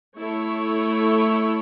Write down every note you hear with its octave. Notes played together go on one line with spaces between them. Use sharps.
A3 E4 A4 C#5